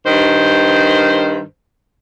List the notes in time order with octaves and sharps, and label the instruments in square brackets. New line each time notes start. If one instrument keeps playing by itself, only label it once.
[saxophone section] G2 D#3 C5